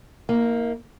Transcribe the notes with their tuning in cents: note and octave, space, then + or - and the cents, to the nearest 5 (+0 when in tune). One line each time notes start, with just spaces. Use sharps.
A#3 +0 E4 -45